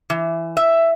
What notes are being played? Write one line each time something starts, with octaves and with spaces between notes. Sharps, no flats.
E3
E5